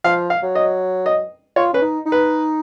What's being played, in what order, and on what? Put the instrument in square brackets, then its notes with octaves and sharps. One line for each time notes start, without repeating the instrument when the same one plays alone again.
[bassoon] F3 [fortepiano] F5
[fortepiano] F5
[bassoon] F#3
[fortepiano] D#5
D#5
[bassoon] F4 [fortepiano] C#5
[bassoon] C#4 [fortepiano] B4
[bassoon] D#4
D#4
[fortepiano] B4